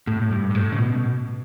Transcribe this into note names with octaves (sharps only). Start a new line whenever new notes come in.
A2
A2
G2
G2
A2
C#3
B2